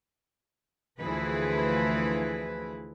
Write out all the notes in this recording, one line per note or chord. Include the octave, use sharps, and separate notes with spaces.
D2 E3 F3 E4 G#4 B4